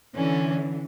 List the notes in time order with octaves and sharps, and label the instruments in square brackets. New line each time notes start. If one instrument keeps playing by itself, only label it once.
[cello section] D3 E3 [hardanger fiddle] C#4